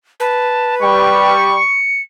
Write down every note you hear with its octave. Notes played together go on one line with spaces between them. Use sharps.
B4 A5
G3 G5 C#6
C#7